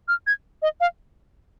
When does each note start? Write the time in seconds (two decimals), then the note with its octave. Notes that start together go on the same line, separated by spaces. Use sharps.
0.08 F6
0.27 G#6
0.62 D#5
0.80 F5